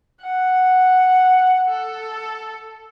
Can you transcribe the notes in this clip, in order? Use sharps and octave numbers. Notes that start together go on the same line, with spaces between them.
F#5
A4